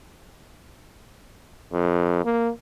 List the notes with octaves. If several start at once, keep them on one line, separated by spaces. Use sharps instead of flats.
F2
A#3